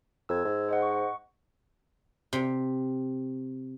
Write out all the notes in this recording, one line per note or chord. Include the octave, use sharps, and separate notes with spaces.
F2 E6 G#6
G#2
C5 D#5 F#5
C#6
C3